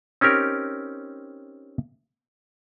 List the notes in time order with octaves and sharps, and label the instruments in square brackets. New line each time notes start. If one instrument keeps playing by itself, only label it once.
[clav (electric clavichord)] C4 C#4 D#4 G4 A#4